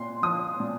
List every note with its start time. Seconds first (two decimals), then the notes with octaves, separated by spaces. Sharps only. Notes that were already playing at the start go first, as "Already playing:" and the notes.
Already playing: A#2 C6
0.22 F3 D#6
0.60 A#2